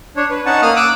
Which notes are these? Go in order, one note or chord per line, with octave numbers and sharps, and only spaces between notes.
D4 C#5
B4
C#4 D#4 F#5 A5 C#6
A#3 D#6 F6
D6 E6 F#6